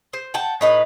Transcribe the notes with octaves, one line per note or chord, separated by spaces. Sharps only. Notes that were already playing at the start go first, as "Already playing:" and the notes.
C5
F#5 G5 A5
A2 D#4 B4